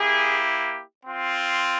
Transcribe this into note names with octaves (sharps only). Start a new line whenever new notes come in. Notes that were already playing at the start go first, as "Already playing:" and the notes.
Already playing: A#3 E4 G4 G#4
C4 F4